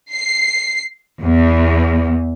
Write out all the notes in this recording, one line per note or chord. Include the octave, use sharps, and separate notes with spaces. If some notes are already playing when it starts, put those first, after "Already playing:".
C7
E2